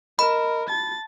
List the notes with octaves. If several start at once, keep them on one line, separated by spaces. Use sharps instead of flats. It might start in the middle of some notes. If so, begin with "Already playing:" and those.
A#4 D#5 B5
A5 A6